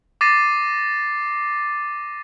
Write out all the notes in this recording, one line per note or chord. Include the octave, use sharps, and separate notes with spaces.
D6 A6 A#6 C7 D#7